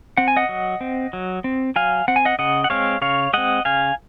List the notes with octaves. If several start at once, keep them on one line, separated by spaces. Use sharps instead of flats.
C4 F#5
G#5
D#5 F#5
F#3
C4
F#3
C4
F#3 F5 G#5
C4 F#5
G#5
D#5 F#5
C#3 D#5 F#5
F#5
G#3 C4 C#5 F5
C#3 C#5 F5
G#3 C4 D#5 F#5
C#3 F5 G#5